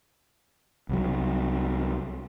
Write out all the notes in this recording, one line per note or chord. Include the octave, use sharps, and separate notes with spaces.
C2 F#3